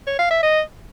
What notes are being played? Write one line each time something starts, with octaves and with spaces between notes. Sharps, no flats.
C#5
F5
E5
D#5